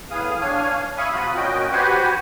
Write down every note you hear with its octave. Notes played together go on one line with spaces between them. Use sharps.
E2 A2 B3 G#4 F5 D#6
D4 C#5 F5 G#5
E5 F5 G#5 B5 C#6 D#6
C3 F4 F#4 B5 D#6
A#2 C#4 F#4 D#5 G5
F#4 G4 B4 C5 F#5 G#5